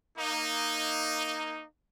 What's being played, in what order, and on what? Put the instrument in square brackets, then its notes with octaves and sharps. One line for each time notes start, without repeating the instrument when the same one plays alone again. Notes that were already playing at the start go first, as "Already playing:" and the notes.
[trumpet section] A#3 D#4